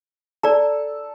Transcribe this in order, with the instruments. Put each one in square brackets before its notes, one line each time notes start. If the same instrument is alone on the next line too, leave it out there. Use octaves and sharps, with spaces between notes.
[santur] A4 [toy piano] D5 A#5